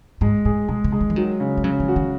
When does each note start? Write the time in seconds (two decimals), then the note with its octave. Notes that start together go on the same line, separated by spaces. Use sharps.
0.21 G#2 G#3
0.45 A2 G#4
0.68 B2 G#3
0.84 C#3
0.92 G#3
1.01 D#3
1.10 E3
1.16 D#3 F#3
1.40 C#3
1.57 G#3
1.64 C#3 F#3
1.80 E3
1.88 F#4
1.96 D#3